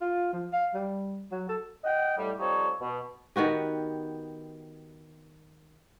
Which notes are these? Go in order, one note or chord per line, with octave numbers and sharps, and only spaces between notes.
F4
F3
F5
G3
F#3
A4
D#5 F#5 G5
A2 G3
F3 G3 C4 D#4 A4 C#5
B2
D#3 B3 F#4 G4